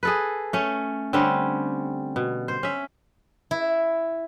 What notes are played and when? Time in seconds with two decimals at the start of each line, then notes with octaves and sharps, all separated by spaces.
0.03 G#4 A4 B4
0.53 A3 C#4
1.13 D3 G3 C4 C#4
2.16 B2
2.48 C5
2.63 C#4 E5
3.51 E4